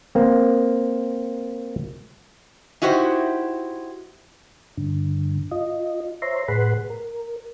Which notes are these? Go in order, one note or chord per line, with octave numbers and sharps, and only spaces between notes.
A#3 C4
D#4 E4 F#4 G4 A4 C5
G2 D3
F4 D#5
C5 C#5 E5 A#5 C6
A2 G#4 B4 F#5 B5 C6
A#4